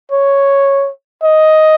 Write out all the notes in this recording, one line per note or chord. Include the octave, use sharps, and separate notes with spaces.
C#5
D#5